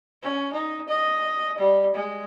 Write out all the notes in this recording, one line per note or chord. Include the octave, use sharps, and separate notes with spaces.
C#4
D#4
D#5
G3
G#3